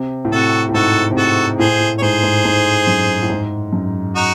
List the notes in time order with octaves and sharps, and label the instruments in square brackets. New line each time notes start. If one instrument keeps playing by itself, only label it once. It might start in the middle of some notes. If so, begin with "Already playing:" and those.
Already playing: [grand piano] C3
A2
[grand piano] C3 [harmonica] F#4 A4
[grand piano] A2
[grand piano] G#2 [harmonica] F#4 A4
[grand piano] C3
[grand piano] A2 [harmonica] F#4 A4
[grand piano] A2 [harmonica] G#4 C5
[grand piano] A2
[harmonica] C#5
[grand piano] G#2 [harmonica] G#4 C5
[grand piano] G#2
G#2
F#2
A2
G#2
F#2
[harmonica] D#4 F#4